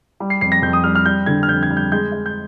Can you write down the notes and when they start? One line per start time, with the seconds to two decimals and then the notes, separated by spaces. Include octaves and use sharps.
0.20 G3
0.30 C7
0.41 F2 C7
0.52 A#6
0.62 F2 G6
0.73 D#6
0.84 G3 F6
0.95 F6
1.06 G3 G6
1.26 D3 G#6
1.43 F6
1.48 F2 G6
1.63 G#6
1.70 G3
1.77 G6
1.92 G#3 G6
2.12 G#3
2.26 G6